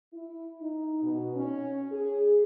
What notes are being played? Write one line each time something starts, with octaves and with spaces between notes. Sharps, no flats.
E4
D#4
B2
C#4
G#4